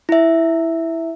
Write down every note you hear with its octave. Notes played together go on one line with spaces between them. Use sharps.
E4 E5